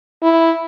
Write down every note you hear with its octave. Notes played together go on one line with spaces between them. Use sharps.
E4